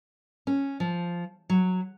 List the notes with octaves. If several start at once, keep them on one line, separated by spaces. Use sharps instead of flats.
C#4
F3
F#3